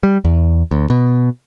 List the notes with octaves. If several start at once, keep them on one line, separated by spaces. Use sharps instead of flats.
G3
E2
D2
B2